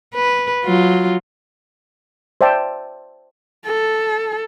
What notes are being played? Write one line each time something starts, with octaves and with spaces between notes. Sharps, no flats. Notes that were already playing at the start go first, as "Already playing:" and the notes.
B4
F#3 F4
C5 D5 E5 G5 A5
A4